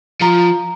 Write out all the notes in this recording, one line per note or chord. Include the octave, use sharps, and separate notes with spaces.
F3 A#5